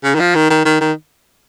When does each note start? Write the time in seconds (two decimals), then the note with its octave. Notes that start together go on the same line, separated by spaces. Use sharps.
0.04 C#3
0.15 D#3
0.20 F3
0.35 D#3
0.50 D#3
0.65 D#3
0.81 D#3